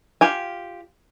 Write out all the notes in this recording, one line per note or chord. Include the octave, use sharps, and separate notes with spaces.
F4 G4 G#5